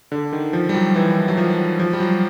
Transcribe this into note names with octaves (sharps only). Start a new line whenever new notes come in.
D3
D#3
F3
G3
F#3
E3
F#3
F3
F3
G3
F#3